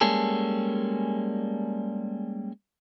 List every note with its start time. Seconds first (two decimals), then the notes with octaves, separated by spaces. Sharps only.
0.01 G3 G#3 A#3 C#4 G#4 A4